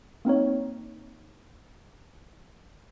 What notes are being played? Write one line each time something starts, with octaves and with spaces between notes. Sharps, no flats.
A#3 C4 D#4 C#5